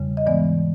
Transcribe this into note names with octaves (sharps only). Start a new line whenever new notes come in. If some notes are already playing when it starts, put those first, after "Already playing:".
Already playing: E2 C#3 G3
D#5
G#2 E3 G#3 B3 D5